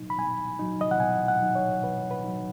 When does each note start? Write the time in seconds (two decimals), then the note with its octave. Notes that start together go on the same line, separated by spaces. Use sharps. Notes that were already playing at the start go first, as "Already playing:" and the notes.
Already playing: B2 F#3 D#4
0.10 B5
0.18 B2 G#5
0.59 F#3 D#4
0.81 D#5
0.91 F#5
1.00 B2 G#5
1.28 F#5
1.42 F#3 D#4
1.55 C#5
1.82 B2 B4
2.11 B4
2.24 F#3 D#4